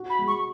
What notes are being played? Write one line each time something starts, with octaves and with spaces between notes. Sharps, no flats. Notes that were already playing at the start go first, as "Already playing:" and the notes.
Already playing: F#4
B5
G#3
C#6